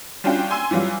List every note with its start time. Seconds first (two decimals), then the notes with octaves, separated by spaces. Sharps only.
0.24 G3 C#4 D4 F4 F#4 G5
0.50 G#5 C6 E6 D#7
0.71 E3 F#3 G3 F4